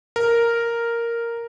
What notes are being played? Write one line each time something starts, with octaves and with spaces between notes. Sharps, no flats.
A#4